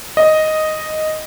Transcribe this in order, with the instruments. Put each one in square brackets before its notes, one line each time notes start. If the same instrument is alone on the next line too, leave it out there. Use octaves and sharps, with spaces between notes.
[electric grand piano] D#5